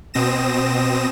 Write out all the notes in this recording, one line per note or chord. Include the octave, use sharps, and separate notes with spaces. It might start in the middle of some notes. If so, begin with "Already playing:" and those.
B2 C4 D#6 A#6 E7